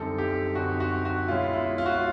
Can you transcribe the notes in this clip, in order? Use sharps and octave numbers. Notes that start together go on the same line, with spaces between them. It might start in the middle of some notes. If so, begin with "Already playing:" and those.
Already playing: F#2 D3 G3 C4 D#4 A4
G4
F#2 D3 G3 C4 D#4 F#4
F#4
F#4
B2 G#3 C#4 E4 F4
E4
F4
F#4
F4